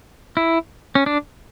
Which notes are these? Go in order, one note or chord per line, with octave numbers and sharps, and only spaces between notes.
E4
C#4
D4